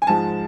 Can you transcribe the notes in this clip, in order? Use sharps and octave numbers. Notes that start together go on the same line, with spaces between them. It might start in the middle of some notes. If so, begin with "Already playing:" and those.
G#5
G#2 F3 G#3 A5